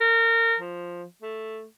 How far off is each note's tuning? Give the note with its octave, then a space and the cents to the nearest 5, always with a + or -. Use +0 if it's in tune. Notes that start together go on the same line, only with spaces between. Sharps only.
A#4 -30
F3 +5
A3 +0